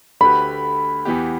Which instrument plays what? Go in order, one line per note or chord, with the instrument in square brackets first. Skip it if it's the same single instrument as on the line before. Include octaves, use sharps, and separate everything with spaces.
[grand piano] D2 D3 A3 G4 B4 [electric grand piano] B5
[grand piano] E2 E3 B3 G4